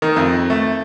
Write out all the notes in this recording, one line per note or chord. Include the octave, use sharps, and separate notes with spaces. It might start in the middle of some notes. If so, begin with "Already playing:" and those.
D#3
F2
A3